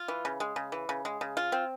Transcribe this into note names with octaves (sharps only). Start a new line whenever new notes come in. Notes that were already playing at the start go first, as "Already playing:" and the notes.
Already playing: F4
E3
C#3
G#3
C#3
E3
C#3
G#3
C#3
F4
C4